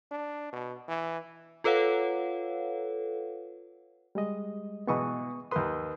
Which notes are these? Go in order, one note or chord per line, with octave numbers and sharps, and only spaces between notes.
D4
B2
E3
F4 A4 B4 C#5 F5 F#5
G3 G#3 D#5
B2 E3 G#3 B3 C#6 D#6
D#2 A#4 B4 C6 D#6